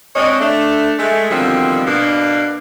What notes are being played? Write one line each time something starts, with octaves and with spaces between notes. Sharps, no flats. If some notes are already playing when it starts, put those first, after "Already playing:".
G#3 C4 D4 C#5 D#5
A3 D4
G#3 A3
B2 D3 D#3 F3 G3 C4
B2 A#3 D4